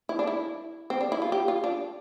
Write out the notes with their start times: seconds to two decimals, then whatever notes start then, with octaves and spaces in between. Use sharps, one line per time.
0.09 E4
0.19 D4
0.27 E4
0.90 C4
1.01 D4
1.12 E4
1.22 F4
1.32 G4
1.48 F4
1.64 D4